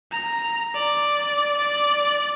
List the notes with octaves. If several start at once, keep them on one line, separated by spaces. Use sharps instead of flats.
A#5
D5
D5